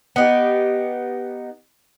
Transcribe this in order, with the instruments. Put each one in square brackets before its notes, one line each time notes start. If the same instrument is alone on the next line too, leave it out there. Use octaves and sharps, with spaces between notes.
[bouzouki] B3 D#4 G4